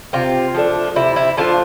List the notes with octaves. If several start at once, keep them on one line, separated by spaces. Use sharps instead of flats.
C3 F4
F3 A3 D4
C3 E4
E4
F3 A3 D4 F4